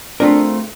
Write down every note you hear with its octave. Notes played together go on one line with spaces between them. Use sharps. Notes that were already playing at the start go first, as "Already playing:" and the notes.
A3 C4 D4 F4 A#4